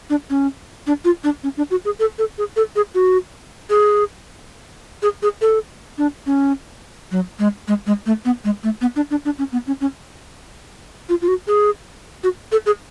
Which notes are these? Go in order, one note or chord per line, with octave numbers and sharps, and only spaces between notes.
D4
C#4
D4
F4
D4
C#4
D4
F#4
G#4
A4
A4
G#4
A4
G#4
F#4
G#4
G#4
G#4
A4
D4
C#4
F#3
G#3
G#3
G#3
A3
B3
G#3
A3
B3
D4
D4
D4
C#4
B3
C#4
C#4
F4
F4
F#4
G#4
F#4
A4
G#4